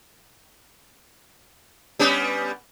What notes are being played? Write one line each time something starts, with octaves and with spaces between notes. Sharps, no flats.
G3 B3 C#4